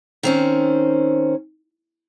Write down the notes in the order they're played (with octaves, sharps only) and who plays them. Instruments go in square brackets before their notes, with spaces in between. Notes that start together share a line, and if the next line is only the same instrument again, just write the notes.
[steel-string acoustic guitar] D#3 C4 C#4